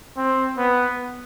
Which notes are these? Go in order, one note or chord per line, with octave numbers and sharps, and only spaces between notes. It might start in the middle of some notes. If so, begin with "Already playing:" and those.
C4
B3